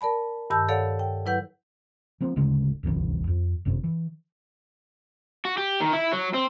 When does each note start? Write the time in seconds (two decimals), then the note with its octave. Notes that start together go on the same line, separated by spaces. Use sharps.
0.01 A#4 D5 A5 B5
0.50 G2 D#3 A5 E6 G6
0.69 A4 C#5 D5 F5 F#5
0.99 G5
1.26 F#3 E4 B4 F#5 G6
2.21 F3 A#3 C4
2.36 D1 D2 C#3 G#3
2.83 D1 G1 C2 E3
3.27 F2
3.65 G1 F#2 C3
3.84 E3
5.45 F#4
5.57 G4
5.80 D#3
5.93 E4
6.12 F#3
6.34 C4